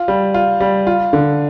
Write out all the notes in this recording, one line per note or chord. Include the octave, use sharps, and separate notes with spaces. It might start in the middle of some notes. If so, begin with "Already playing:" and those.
Already playing: F4
G3
F4
G3
F4
D3